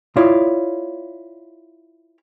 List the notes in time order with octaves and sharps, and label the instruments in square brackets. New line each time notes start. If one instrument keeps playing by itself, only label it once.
[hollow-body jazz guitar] E4 F4 C#5 D5